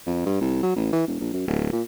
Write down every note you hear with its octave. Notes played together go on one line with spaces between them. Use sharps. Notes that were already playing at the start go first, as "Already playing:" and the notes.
F2
G2
C2
F#3
A1
E3
E1
A#1
F#2
D1
A#2